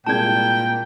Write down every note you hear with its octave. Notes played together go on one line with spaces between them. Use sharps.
C2 A#2 G#3 G5 A5 G#6